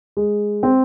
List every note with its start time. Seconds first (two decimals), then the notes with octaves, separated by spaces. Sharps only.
0.17 G#3
0.63 C4